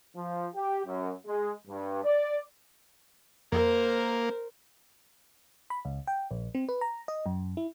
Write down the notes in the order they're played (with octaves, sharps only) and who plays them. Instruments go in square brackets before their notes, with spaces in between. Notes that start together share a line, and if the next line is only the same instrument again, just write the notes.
[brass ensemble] F3
G4
F#2
G#3
G2
D5
[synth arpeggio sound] F2 [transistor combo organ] A#3 [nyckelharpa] A#4 C5
[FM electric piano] B5
C#2
G5
A#1
C4
B4
A#5
D#5
F#2
E4